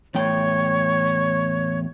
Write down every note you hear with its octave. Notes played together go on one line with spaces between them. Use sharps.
E2 A2 C#5 G5